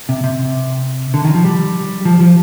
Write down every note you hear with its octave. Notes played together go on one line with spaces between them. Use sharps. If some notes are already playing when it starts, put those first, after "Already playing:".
C3
C3
D3
D#3
F3
G3
F3
F3